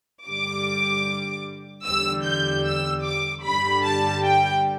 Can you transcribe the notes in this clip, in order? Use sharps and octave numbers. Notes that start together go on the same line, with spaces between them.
G2 D3 G3 D6
E2 D3 G3 E6
G6
E6
D6
G2 D3 G3 B5
A5
G5